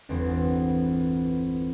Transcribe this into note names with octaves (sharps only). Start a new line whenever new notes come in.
G1 E2 C4 C6